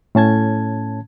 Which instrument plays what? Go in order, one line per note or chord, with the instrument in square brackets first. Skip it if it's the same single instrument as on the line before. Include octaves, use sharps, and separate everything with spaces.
[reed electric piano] A2 C#4 A5 G#6